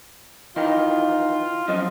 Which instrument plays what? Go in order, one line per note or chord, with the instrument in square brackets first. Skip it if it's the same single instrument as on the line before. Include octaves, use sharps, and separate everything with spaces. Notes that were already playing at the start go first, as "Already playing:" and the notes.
[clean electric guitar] D#3 E3 D#4 [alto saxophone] F4
[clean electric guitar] F#2 F3 [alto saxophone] D#5